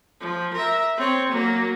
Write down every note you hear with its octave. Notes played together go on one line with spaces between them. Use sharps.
F3
A#4 E5
C4 C#5
F#3 A#3